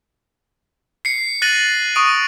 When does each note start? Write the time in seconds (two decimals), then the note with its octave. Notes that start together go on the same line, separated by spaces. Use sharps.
1.05 C7 C#7
1.42 F#6 A6 A#6 D#7 F#7
1.95 C#6 D#6 D7